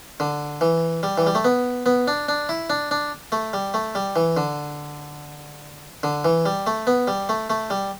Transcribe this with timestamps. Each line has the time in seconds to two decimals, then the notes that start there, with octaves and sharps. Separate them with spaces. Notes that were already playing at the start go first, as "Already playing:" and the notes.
0.20 D3
0.61 E3
1.03 G3
1.18 E3
1.27 G3
1.35 A3
1.45 B3
1.86 B3
2.08 D4
2.28 D4
2.49 E4
2.70 D4
2.91 D4
3.32 A3
3.53 G3
3.74 A3
3.95 G3
4.16 E3
4.37 D3
6.03 D3
6.25 E3
6.46 G3
6.67 A3
6.87 B3
7.08 G3
7.29 A3
7.50 A3
7.70 G3